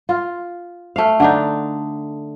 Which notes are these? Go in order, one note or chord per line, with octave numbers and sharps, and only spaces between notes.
F4
A3 F5
D3 D4 D#4